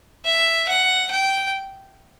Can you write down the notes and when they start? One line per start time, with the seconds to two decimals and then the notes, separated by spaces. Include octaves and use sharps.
0.25 E5
0.68 F#5
1.11 G5